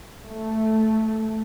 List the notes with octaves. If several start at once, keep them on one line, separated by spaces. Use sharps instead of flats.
A3